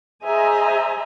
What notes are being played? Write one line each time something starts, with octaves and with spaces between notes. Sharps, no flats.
G#4 C5 D#5 E5 G#5 A#5